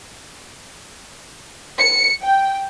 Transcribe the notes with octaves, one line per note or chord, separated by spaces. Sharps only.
C#7
G5